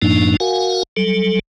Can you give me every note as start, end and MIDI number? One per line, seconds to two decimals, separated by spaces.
0.02 0.37 42
0.02 0.37 45
0.02 0.37 53
0.02 0.37 58
0.02 0.37 62
0.02 0.37 63
0.40 0.83 66
0.40 0.83 70
0.40 0.83 77
0.40 0.83 78
0.40 0.83 80
0.97 1.39 54
0.97 1.39 55
0.97 1.39 69